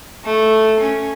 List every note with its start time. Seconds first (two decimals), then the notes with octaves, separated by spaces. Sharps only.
0.24 A3
0.80 C#4